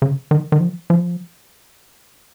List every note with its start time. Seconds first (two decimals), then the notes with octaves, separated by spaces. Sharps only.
0.02 C#3
0.31 D#3
0.52 D#3
0.60 F3
0.90 F3